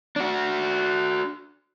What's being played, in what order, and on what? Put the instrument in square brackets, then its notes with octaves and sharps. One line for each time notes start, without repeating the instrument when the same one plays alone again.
[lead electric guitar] D4 F#4